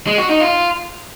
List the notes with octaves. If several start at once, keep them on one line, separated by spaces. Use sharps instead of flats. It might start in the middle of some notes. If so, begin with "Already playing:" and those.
G#3
F#4
D#4
F4